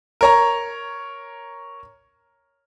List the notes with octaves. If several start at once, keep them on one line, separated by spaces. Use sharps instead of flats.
A#4 C#5 A#5